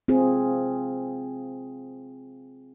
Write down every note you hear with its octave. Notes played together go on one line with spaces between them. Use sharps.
C4 F4 G#4